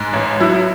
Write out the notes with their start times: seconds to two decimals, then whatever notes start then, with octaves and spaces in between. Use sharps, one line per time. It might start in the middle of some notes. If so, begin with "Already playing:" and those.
Already playing: G#2
0.13 A1
0.40 F#3 E4